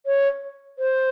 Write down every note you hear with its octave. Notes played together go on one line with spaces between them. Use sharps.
C#5
C5